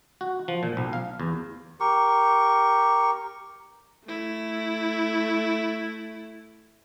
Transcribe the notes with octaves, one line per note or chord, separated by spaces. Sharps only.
F#4
F3
A#2
B1
F5
E2
G4 A#4 C#6
A3 E4